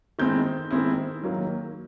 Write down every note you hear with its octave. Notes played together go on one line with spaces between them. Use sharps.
D#3 G#3 C4 E4 G6
D#3 G#3 C4 E4
D#3 F#3 A#3